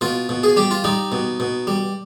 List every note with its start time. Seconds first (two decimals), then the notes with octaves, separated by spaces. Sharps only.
0.01 B2 F4
0.29 B2
0.43 G#4
0.56 G3 G4
0.71 F4
0.84 G3 D#4
1.12 B2
1.40 B2
1.67 G3